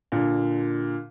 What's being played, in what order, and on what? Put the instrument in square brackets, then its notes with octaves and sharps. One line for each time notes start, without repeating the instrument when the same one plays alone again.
[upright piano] A#2 D3